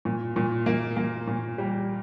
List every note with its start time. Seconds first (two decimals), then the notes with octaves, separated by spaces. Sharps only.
0.05 A#2
0.36 A#2
0.66 A#3
0.97 A#3
1.28 A#2
1.58 G3